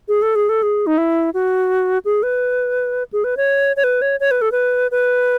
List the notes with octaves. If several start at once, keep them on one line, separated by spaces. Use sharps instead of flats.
G#4
A4
G#4
A4
G#4
D#4
E4
F#4
G#4
B4
G#4
B4
C#5
C#5
B4
C#5
C#5
B4
A4
B4
B4